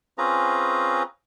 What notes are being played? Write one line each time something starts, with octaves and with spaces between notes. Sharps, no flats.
C4 C#4 F4 G#4 B4 A#5